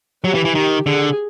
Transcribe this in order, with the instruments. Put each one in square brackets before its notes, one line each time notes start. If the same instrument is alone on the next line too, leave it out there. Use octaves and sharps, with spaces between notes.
[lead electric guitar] F#3 [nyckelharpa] G4
[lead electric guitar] E3
E3
[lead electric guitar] D#3 [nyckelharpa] G4
[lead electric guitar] D3 [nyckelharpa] G#4